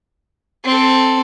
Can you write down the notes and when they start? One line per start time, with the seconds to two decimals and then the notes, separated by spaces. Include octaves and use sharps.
0.65 C4 A4